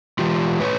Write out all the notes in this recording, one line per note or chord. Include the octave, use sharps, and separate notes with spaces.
E3 G#3 F4 G4
A2 B4 C#5